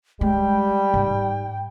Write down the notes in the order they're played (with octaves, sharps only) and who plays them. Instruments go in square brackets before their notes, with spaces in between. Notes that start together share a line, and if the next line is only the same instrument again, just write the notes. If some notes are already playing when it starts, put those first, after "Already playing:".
[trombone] G3 [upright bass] G#3 [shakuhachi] G5
[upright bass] G#2